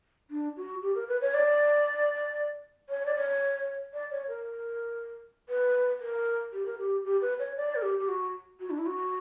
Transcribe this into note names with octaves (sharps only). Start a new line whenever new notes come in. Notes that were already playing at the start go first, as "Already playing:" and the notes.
D4
F#4
G4
A#4
B4
C#5
D5
C#5
D5
C#5
D5
C#5
A#4
B4
A#4
G4
A#4
G4
G4
B4
C#5
D5
A#4
G4
G4
F#4
F#4
D4
E4
F#4